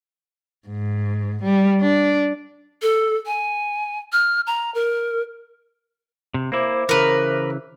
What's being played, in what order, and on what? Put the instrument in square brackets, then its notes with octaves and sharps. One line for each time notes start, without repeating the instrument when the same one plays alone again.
[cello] G#2
G3
D4
[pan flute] A4
G#5
F6
A#5
A#4
[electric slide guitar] C3
[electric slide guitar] A#3 E4 [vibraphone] C5 E5 D6
[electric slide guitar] C#3 E3 [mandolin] A#4 B4